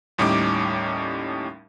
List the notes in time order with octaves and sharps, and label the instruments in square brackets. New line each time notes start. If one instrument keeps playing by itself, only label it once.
[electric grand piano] D#2 A2 G3 C#4 D#4 D6